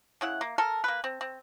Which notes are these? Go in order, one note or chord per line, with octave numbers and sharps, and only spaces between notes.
C#3 E4 F#5
A#3
A4 A#4
A#3 B4
C4
C4